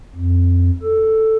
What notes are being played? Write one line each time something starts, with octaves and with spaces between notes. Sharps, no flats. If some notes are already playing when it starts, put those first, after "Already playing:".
F2
A4